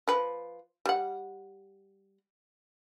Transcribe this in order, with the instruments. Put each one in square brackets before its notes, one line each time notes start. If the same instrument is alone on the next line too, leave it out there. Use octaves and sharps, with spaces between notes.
[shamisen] F3 B4
G3 F#5